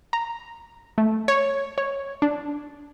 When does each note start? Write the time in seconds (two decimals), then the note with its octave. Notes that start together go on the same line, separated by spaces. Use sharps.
0.13 A#5
0.98 A3
1.28 C#5
1.78 C#5
2.22 D4